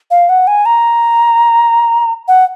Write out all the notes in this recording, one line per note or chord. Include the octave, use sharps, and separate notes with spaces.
F5
F#5
G#5
A#5
F#5